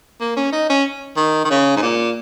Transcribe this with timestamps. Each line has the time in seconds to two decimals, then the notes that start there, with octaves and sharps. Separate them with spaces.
0.21 A#3
0.37 C#4
0.52 D#4
0.70 C#4
1.17 D#3
1.45 D#3
1.50 C#3
1.76 G#2
1.82 A#2